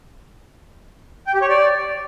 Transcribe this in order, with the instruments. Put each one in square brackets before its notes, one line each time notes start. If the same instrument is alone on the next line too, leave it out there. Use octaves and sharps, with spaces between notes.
[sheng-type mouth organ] G5
G4
C#5
D5